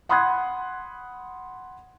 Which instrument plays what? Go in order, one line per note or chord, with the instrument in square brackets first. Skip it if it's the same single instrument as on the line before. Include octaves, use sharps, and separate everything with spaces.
[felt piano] F#5 B5 C6 D#6 F#6 G#6